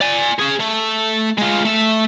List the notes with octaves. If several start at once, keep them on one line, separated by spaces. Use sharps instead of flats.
D5 G#5
C#4 G#4
A3
G#3 F4
A3 E5